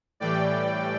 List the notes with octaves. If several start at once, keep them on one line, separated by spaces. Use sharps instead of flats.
A2 E3 G3 D5 G5